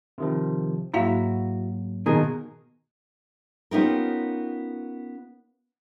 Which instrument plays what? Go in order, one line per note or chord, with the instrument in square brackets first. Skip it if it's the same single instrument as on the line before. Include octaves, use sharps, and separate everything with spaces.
[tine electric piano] C3 D#3 F3
[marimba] G#2 A#3 F5 [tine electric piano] F#3 [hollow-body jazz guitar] E4 F#4
[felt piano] B2 [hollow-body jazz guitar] D#3 G#4 A#4
[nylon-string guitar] B3 C#4 D#4 F4 G4 A#4